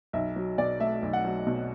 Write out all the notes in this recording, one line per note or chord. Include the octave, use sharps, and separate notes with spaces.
B1 E5
F#3
B2 D5
A3 E5
B1
F#5
F#3
B2